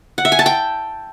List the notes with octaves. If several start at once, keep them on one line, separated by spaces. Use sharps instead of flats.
F#5
E5
G#5
A5
G5